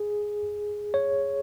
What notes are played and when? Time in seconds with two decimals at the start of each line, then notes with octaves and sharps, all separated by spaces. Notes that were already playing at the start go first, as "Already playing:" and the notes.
Already playing: G#4
0.94 C#5